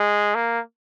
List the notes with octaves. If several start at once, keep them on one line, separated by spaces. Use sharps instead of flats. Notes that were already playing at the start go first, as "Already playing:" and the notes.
Already playing: G#3
A#3